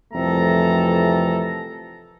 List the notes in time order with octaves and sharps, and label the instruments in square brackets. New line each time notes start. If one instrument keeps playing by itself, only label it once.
[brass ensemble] C2 F2 E3 A3 A4 A#5